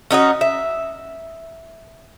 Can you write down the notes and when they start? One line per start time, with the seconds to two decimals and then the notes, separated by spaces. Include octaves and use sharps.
0.11 C#4 D#4 F#4 D#5
0.41 E5